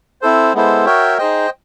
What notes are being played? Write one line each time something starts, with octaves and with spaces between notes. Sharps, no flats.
C4 E4 A4 C5
G#3 B3 E4 A4 C5
F#4 A#4 C#5 E5 G5
D#4 G#4 C5 D#5 G5